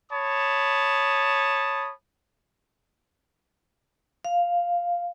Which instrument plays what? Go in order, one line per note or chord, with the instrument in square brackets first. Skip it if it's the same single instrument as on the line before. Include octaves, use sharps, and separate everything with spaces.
[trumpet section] C#5 A5 B5 D#6
[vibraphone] F5